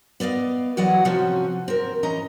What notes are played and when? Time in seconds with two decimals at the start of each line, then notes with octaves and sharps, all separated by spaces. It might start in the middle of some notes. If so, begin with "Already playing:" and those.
0.20 B3 D5 D#5 F5
0.77 E3 F#3 F#4 D5 D#5 F#5
1.05 C3 F3 C4 C#4 F#4
1.68 C4 A#4
2.03 E3 C#4 D#5 A#5